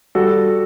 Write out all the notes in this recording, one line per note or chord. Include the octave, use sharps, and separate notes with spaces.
G3 F#4 A4